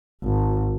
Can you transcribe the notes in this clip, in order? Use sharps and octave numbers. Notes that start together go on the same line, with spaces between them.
G#1